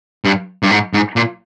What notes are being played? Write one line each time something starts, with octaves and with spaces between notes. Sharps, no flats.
G2
G2
G#2
G#2
A#2